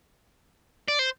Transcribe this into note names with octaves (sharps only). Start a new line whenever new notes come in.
D5
C5